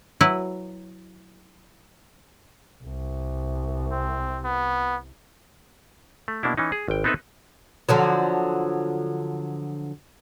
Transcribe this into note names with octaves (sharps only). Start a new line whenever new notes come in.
F#3 E4 B4
C2
C4
B3
A3
B2 A#3 D4 E4
E3 C#4 D#4
G#4
G#1 G5
B3 C4 D#4 A4 B4 E5
D3 F3 F#3